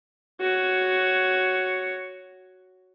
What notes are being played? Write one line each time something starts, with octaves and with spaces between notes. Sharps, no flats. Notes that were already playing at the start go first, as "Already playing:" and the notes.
F#4 C#5